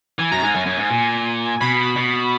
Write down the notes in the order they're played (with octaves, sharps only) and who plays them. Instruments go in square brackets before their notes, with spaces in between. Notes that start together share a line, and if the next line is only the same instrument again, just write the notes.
[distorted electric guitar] E3 [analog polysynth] G#5
[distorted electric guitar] F#2 [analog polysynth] A#5
[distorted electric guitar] G#2 [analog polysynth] G#5
[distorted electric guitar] F#2 [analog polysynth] G#5
[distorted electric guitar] F#2
G#2
A#2
[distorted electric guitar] B2 [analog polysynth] B5
[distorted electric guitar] B2